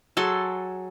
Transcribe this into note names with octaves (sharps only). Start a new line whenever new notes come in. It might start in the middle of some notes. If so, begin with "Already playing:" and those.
F#3 G#4 A4 C6